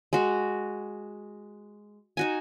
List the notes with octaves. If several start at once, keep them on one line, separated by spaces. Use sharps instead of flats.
G#3 F#4
D#4 F#4 G#5